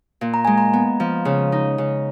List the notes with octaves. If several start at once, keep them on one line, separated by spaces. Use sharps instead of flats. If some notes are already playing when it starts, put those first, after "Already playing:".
A#2
A#5
G#3 G#5
A#5
B3
F3
C#3
D#4
C#3